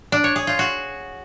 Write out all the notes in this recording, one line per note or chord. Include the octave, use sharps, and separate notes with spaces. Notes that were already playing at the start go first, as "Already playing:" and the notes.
D4
C#5
G#4
F4
F#4